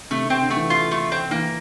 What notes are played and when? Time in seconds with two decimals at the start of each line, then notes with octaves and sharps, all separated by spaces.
0.11 C3 A3
0.25 C3
0.30 C4
0.41 D3
0.50 A3
0.56 E3
0.70 F4
0.91 A3
1.12 C4
1.31 E3 A#3